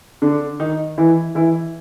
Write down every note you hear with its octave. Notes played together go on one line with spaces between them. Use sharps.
D3 D4
D#3 D#4
E3 E4
E3 E4